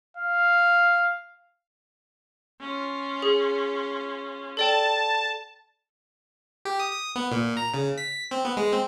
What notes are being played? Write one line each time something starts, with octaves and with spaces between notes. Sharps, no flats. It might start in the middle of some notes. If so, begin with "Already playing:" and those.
F5
C#4 F4
G#4
A4 D5 G5 A5
G4
D#6
D#6
B3
A#2
A#5
C#3
B6
C4
B3
G#3
C4